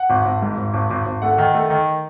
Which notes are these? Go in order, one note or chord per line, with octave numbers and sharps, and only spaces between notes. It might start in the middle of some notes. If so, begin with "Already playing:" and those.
Already playing: F#5
G#1
G#1
G#2
G#1
G#1
G#1
G#1
A3 F#5
D#3
A3
D#3